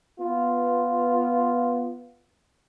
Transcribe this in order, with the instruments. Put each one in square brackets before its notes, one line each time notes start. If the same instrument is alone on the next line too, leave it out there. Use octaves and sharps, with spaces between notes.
[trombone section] B3 F4